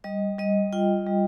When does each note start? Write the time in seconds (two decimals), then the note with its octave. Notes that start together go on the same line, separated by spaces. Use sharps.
0.04 G3 D#5
0.38 G3 D#5
0.73 F4 G5
1.06 G3